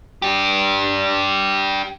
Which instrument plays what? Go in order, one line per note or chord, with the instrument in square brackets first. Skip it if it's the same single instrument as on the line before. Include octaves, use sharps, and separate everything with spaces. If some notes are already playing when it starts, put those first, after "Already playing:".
[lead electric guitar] D4 G4